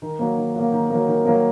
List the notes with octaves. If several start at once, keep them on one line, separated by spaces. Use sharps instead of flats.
D#3
F#3 A#3
D#3
F#3 A#3
D#3
F#3 A#3
D#3
F#3 A#3